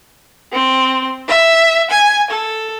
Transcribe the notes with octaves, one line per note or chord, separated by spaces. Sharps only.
C4
E5
G#5
A4